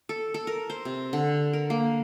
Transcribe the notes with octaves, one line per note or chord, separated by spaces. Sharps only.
A4
A4
A#4
C5
C3
D3
A#4
A#3